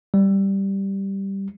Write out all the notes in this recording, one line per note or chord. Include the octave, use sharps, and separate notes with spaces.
G3